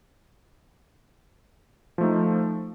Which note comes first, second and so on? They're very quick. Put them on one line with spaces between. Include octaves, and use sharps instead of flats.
F3 A3 D#4